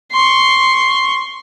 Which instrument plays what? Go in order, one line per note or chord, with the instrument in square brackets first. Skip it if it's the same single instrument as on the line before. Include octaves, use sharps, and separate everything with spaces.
[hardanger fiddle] C6 C#6